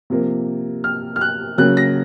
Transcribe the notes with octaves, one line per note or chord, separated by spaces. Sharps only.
C3 F3 A#3
F6
F6
F#6
C#3 F#3 A#3 F#6
A#6